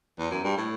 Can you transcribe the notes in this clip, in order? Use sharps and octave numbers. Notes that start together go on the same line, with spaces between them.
E2
F#2
G2
A2